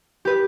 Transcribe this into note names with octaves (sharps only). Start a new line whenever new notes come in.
G4 B4